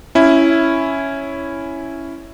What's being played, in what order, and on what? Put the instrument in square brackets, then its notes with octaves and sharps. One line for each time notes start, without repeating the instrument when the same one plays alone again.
[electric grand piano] C#4 E4